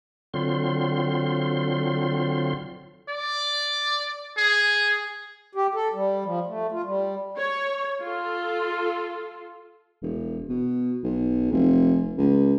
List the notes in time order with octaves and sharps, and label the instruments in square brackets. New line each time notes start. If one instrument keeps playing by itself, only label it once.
[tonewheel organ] D3 F#3 C4 F4 C6
[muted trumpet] D5
G#4
[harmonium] G4
A4
G3
F3
A3
F4
G3
[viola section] C#5
F4 A4
[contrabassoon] E1
B2
B1
F1
C#2